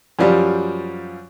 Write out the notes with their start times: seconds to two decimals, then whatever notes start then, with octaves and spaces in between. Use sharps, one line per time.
0.19 F#2 F3 G3